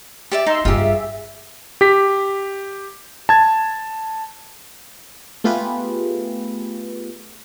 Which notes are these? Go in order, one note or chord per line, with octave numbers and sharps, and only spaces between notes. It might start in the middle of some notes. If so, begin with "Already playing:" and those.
G4 D5 E5 A6
D#4 C6 E6
G2 G3 F4 G4 G#4 E5
G4 B6
A5 G#6
A3 B3 F4 G4 G#4 B4